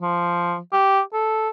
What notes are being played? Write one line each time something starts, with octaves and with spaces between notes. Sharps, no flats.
F3
G4
A4